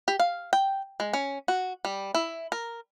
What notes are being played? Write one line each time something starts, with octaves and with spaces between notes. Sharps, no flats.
G4
F5
G5
G#3
C#4
F#4
G3
E4
A#4